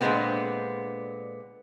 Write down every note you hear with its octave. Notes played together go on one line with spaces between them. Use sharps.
A#2 D3 E3 G#3 B3 C4